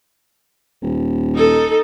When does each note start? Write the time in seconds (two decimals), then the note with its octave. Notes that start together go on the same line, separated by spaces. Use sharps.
0.82 D#1
1.35 D#4 A4